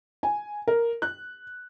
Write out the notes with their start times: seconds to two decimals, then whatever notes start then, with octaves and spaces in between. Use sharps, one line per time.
0.23 G#5
0.68 A#4
1.02 F#6